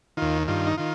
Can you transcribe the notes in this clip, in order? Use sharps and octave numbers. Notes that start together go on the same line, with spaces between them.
D#2 D#3 F4
G2 D#3 F4
D#4
D#3 F4